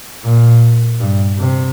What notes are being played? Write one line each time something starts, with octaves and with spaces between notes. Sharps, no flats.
A#2
G2
C3